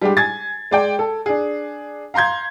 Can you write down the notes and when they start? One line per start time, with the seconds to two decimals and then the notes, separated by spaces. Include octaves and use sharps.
0.02 G3 G#3 D4 G4
0.17 G#5 G#6 A6
0.71 G#3 D5 G5
0.99 A4
1.26 D4 G#4
2.14 F5 A#5 C6 G6 G#6